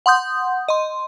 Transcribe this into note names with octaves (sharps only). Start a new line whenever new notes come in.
F#5 C6 D#6 G6
D#5 C6